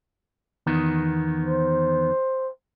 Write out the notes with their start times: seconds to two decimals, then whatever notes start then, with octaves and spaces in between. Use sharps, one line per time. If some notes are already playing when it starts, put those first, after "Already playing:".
0.67 E2 D#3 B3
1.45 C5